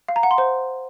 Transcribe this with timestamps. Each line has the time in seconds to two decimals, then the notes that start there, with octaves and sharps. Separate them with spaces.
0.08 F5
0.16 A#5
0.23 F#5
0.31 C6
0.38 C5